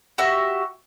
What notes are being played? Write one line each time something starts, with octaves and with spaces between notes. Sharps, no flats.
F#4 G4 E5